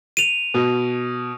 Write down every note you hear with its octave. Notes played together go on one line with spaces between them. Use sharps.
D#7 F7
B2